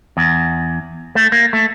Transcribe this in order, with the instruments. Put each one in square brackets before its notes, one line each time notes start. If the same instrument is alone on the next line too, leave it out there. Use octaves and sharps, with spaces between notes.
[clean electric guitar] E2
A3
A#3
A3